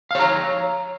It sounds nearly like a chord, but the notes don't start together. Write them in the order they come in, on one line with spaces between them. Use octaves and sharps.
F5 C#5 A#5